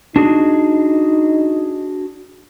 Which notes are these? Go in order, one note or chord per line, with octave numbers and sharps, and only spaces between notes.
D4 D#4 F#4 G#4